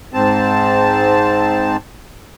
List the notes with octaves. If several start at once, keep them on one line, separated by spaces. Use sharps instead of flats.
G#2 C4 A5